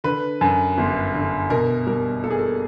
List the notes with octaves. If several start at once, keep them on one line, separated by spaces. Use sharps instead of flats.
D3 B4
F#2
G1
D3
B2 A#4
G3 A#4
A#3 A4
G#4
A4